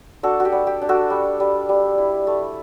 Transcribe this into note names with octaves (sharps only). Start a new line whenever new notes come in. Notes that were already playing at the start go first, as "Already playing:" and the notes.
D4 F#4 A4
F#4
G4
G3
G4
D4
F#4 A4
G3
G3
G3
E4
A3